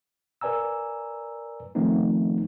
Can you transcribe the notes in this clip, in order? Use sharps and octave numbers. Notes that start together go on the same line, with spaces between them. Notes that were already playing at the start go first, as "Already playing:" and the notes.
A#4 B4 D5 G#5 A#5 E6
D#3 F3 A3 B3 C4 D#4